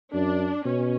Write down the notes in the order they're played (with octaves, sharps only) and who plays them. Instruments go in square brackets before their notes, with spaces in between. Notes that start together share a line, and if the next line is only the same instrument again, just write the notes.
[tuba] F#2 [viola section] D4
[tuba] B2 [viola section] C#4